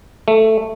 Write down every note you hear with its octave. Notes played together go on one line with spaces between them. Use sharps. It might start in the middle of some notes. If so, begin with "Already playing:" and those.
A3